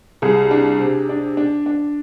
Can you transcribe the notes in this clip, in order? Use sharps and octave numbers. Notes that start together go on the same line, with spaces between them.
C2 G#4
D4
C3
D4
D4
D4